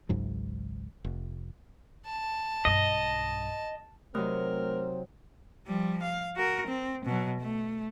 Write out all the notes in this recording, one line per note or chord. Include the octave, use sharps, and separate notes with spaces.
G#1 C#2 G#2 F#3
F1
A5
B1 G2 D#5
C3 F#3 A3 C4 D#4 A#4
F3 G3
F5
F#4 A#4
C4
B2 F#3
A3